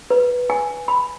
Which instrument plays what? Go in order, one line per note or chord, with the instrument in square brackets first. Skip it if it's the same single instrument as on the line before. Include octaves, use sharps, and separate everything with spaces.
[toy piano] B4
G#5
B5